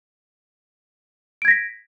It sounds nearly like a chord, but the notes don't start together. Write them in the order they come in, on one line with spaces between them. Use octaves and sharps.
D7 G#6 A#6 B6